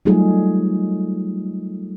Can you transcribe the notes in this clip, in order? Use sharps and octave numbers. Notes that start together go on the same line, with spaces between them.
F#3 G3 A3 D#4 F4 G#4